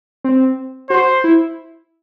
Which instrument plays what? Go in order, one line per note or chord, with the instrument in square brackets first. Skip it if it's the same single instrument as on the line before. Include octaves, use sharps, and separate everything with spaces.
[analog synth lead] C4
[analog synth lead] F#4 [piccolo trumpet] C5
[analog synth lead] E4